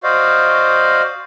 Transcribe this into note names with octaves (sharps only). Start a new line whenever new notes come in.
F#4 C5 D5 D#5 F5